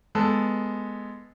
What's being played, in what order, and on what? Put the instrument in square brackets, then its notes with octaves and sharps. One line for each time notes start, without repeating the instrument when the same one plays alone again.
[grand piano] G#3 B3 A4